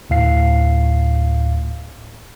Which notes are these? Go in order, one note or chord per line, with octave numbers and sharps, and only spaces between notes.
D2 A2 F5 C7